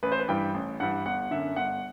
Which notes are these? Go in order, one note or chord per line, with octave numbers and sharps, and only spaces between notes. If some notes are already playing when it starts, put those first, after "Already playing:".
A1 B4
C5
B4
G2 E3 G3 G5
A1
G2 E3 G3 F#5
G1 F#5
F#2 D3 E5
G1 F#5